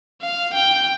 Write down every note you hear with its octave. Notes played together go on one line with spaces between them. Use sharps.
F5
G5